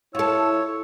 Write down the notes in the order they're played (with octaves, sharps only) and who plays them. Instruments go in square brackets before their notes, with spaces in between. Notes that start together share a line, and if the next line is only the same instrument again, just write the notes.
[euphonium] E4 [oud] F4 A4 [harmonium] C#5 [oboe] E6